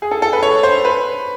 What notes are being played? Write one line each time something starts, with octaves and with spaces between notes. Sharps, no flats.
G#4
A4
A4
B4
C#5
C5
B4